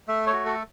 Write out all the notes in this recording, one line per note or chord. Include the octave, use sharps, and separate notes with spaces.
A3 E5
C#5
F#4
A4